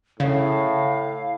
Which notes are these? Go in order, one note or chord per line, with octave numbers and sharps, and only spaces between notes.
A2 C#3 F5